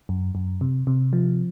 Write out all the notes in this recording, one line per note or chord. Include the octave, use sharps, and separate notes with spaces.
F#2
F#2
C3
C3
F3